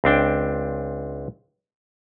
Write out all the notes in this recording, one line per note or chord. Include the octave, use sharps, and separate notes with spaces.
C#2 C4 D4 G5